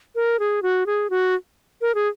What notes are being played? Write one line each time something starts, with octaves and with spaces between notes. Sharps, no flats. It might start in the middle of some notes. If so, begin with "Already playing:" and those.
A#4
G#4
F#4
G#4
F#4
A#4
G#4